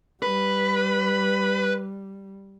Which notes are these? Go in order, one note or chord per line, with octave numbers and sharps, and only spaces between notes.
G3 B4